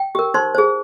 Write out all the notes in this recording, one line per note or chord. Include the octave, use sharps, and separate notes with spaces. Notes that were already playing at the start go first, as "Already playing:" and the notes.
Already playing: G5
G4 A#4
D#4 C5 C6
G#4 C5